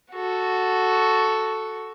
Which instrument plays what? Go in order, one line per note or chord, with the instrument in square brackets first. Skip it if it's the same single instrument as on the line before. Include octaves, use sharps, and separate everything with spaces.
[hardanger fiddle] F#4 A4